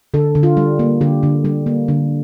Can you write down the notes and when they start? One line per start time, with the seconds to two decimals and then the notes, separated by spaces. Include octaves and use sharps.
0.14 D3 A4
0.35 D3
0.43 F4
0.57 G3
0.79 A#3
1.01 D3 G4
1.23 D3
1.45 G3
1.66 A#3
1.88 D3